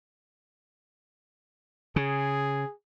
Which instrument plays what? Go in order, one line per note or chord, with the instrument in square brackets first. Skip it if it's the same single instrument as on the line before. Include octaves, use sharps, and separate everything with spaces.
[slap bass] C#3 [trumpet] G#4